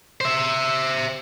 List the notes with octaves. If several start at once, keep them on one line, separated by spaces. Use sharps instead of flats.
C5 E5